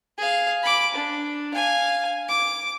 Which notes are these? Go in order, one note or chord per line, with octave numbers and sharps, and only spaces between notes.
G#4 F5
B5 D6
D4
F5 G#5
D6